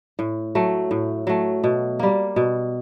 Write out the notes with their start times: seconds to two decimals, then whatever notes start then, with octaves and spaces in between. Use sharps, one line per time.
0.19 A2
0.55 F#3 A3
0.91 A2
1.27 F#3 A3
1.64 B2
1.99 G3 A#3
2.36 B2